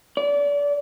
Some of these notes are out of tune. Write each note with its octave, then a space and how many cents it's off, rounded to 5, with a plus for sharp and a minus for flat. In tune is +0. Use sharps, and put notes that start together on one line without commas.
D5 -30